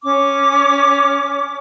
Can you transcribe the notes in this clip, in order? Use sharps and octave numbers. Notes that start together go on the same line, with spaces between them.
C#4 D6